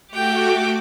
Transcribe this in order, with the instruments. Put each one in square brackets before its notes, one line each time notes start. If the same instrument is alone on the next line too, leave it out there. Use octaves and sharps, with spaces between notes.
[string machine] A3 F#4 D6 [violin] G4 G5